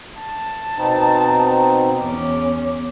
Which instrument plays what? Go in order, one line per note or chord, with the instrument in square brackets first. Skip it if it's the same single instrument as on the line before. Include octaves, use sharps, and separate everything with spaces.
[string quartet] A5
[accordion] B2 C4 D#4
[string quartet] E2 C#4 [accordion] D6